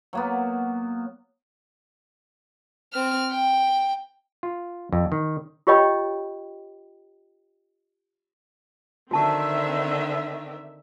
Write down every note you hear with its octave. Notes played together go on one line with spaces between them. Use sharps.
F#3 A#3 B3
C4 F6
G5
F4
F2
D#3
F4 G4 C#5 D#5 G5 B5
D3 D#3 C4 F#4 E5 A5 C#6